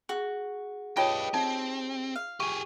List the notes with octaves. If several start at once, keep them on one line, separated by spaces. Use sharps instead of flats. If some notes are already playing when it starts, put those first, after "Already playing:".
F#4 G#4
D#4 F4 G4 B4 C#5 D#5 G5
C4 D#4
F5
G4 G#4 C#6 D#7